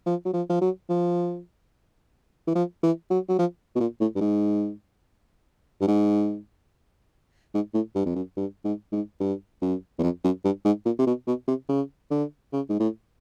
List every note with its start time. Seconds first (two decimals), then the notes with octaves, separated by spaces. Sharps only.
0.06 F3
0.25 F#3
0.33 F3
0.50 F3
0.61 F#3
0.89 F3
2.47 E3
2.55 F3
2.83 E3
3.10 F#3
3.29 F#3
3.39 F3
3.76 B2
3.80 A#2
4.00 A2
4.16 G2
4.21 G#2
5.81 G2
5.87 G#2
7.54 G#2
7.74 A2
7.95 G2
8.06 F2
8.15 F#2
8.37 G2
8.64 G#2
8.92 G#2
9.20 G2
9.62 F#2
9.99 E2
10.03 F2
10.24 F#2
10.44 G2
10.65 G#2
10.85 A#2
10.99 C3
11.07 B2
11.27 B2
11.48 C3
11.69 C#3
12.11 D3
12.52 C#3
12.70 G#2
12.80 A2